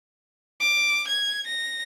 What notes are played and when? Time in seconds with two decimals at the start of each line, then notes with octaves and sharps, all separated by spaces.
0.60 D6
1.07 G#6
1.46 A#6